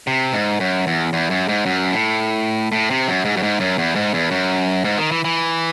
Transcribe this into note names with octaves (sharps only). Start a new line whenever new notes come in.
C3
G#2
F#2
E2
E2
F#2
G#2
F#2
A2
A2
C3
F#2
G#2
F#2
G#2
F#2
E2
G#2
E2
F#2
G#2
D#3
E3
E3